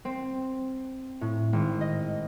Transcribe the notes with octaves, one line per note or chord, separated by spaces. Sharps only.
C4
A2
G#1
D#5